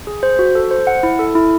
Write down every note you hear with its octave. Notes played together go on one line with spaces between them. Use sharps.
G#4
C5
F#4
A4
C5
F#5
E4
A4
E4